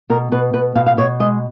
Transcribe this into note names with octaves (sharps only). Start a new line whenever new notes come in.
B2 A#4
B2 B4
B2 B4
B2 F5
F5
B2 C#5
G#3 D#5